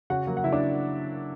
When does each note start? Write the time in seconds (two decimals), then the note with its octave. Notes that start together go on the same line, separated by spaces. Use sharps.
0.10 C#3 F#4 F#5
0.27 F#3 A#3
0.37 F#5
0.44 C#3 E4 E5
0.52 D4 D5